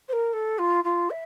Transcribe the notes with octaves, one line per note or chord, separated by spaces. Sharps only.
C5
A#4
A4
F4
F4
E5